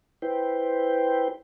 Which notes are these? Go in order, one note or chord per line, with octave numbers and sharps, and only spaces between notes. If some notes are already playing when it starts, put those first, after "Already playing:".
E4 B4 C5 G5